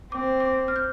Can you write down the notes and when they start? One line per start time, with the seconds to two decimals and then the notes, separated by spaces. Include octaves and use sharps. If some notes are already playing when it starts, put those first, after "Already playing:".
0.12 C4 D6
0.40 D6
0.68 F6
0.76 G6